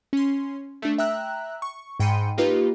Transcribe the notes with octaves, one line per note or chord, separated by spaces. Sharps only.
C#4 C6
A3 D4
E5 G5 A#5 E6 F#6
C#6
G#2 G5 B5 C6 C#7 D#7
A#3 D#4 F4 G4 B4